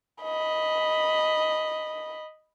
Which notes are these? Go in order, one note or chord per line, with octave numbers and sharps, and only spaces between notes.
D#5 B5